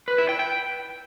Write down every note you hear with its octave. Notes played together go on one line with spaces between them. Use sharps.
B4
E4
G5
G5